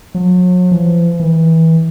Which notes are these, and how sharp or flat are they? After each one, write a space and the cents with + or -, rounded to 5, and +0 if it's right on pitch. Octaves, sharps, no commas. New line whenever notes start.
F#3 -40
F3 -45
E3 -25